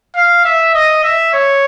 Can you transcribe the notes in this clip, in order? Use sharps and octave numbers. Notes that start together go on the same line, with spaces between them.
F5
E5
D#5
E5
C#5